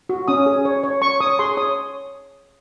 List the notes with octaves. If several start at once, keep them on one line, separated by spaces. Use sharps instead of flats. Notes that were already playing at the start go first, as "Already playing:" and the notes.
F#4
C#4 D#6
G#4
C#5
C#5
C#5 C#6
C#5 D#6
G#4 C6
C#5 D#6